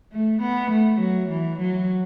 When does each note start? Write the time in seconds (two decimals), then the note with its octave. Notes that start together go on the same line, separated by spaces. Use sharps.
0.12 A3
0.42 B3
0.71 A3
1.00 F#3
1.29 E3
1.59 F#3